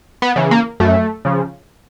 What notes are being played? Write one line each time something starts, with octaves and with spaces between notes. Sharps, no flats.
B3
C#3 E3
A#3
F#2 A3
C#3 F3